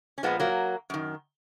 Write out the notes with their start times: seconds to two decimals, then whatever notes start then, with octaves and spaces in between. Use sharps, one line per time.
0.18 C#4
0.23 A#2 F3 G#3 B3
0.40 F#3 A#3
0.90 F#2 D#3